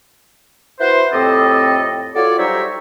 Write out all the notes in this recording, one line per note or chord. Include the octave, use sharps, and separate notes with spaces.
E4 F#4 B4 C5
F2 A2 C4 G4 A4 D#5
F4 F#4 A4 C#5 D5
F#3 G3 D#4 C5 C#5 E5